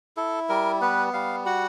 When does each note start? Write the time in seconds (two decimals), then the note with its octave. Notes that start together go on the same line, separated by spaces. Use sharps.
0.17 E4 A4
0.49 G3 A#4
0.81 B3 B4
1.13 G3 F5
1.46 F#4 F#5